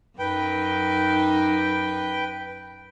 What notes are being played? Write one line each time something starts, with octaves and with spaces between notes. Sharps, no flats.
F#2 D#4 B4 G5